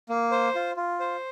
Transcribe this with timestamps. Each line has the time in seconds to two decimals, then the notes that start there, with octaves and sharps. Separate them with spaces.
0.09 A#3
0.31 C5
0.55 F4
0.77 F4
1.00 C5